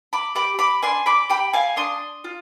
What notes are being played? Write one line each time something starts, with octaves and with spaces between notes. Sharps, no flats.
B5 D6
G4 B5 D6
B5 D6
D4 G#5 C6
B5 D6
G4 G5 B5
F5 G#5
D4 C6 D#6
F4